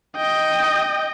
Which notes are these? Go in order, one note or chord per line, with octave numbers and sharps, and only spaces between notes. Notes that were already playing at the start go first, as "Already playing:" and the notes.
D#5 G5